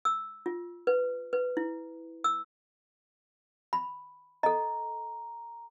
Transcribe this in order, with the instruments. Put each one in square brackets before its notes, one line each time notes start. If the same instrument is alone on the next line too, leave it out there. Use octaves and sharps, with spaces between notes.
[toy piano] E6
F4
B4
B4
E4
E6
B5
[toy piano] A4 D#5 [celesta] A#5